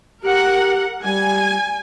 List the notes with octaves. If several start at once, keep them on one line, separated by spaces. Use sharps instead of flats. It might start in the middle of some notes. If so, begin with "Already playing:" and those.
G4 A#4 F#5
G3 G#5